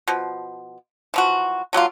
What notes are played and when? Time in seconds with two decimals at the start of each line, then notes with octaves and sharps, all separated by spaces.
0.08 B2 F3
1.14 E3 F3 F#4
1.73 D3 F#3 A#3 F4